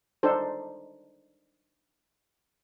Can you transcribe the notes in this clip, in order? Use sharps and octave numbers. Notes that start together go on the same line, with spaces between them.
D4 D#4 A4 C5